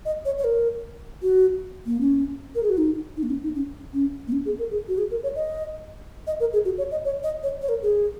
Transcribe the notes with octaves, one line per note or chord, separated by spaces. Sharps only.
D#5
C#5
C#5
A#4
F#4
A#3
C#4
A#4
G#4
F#4
D#4
D#4
A#3
C#4
D#4
C#4
C#4
A#3
C#4
G#4
A#4
G#4
F#4
G#4
A#4
C#5
D#5
D#5
A#4
G#4
F#4
C#5
D#5
C#5
D#5
C#5
C#5
A#4
G#4